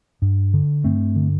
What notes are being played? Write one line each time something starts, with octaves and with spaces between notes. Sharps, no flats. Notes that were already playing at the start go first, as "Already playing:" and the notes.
G2
D3
G2 A3 C4
D3